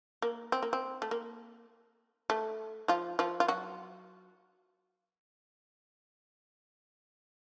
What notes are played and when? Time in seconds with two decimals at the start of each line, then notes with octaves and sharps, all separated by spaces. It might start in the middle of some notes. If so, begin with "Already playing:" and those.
0.22 A#3
0.52 C4
0.63 A#3
0.73 C4
1.02 A3
1.11 A#3
2.30 A3
2.88 F3 F4
3.19 F3 F4
3.40 F4
3.48 F#3 F#4